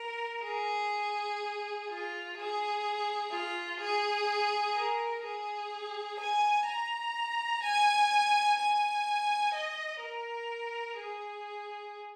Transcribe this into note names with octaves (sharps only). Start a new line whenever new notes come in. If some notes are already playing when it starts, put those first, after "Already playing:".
Already playing: A#4
G#4
F4
G#4
F4
G#4
A#4
G#4
G#5
A#5
G#5
G#5
D#5
A#4
G#4